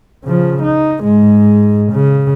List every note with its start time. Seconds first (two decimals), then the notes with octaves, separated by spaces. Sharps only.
0.24 C#3 F3
0.63 D#4
1.03 G#2 G#3
1.92 C#3